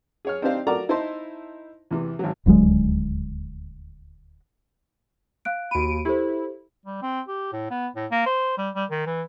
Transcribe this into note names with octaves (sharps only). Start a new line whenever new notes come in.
G#4 C#5 F6
C4 D4 D#4 G4 C5 F5
F#4 A4 A#4 D5 A#5 D6
D#4 E4 C5 D#5 A5 C6
E2 C3 E3
G#1 F#3
D#1 D2 F#3 G#3
F5 F#6 D7
D#2 F#4 B5 D7 D#7
E4 G4 A4 C5
G3
C4
G4
A2
B3
A2
A#3
C5
G3
G3
D#3
E3